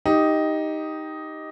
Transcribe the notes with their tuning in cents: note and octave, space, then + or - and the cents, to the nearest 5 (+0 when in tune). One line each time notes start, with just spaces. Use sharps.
D#4 +5 G4 +0